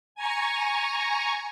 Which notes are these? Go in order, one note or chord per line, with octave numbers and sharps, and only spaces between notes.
G#5 A#5 C#6